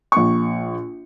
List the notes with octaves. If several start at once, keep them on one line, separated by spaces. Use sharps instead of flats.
A#1 C#6